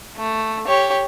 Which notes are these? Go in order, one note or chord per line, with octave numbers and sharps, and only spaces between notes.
A3
G4 C#5